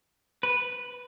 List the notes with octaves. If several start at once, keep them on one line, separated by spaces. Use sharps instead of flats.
B4